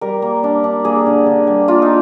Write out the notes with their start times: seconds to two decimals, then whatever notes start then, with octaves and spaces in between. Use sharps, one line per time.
0.01 G3 A#4
0.22 A#3
0.44 D4
0.64 D4
0.85 A#3 G#4
1.06 D3
1.26 D3
1.47 G3
1.68 A#3 F4
1.82 D#4